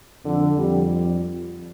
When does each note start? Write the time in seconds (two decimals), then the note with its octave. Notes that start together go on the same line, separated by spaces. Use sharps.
0.24 F2 D3
0.57 F2 G3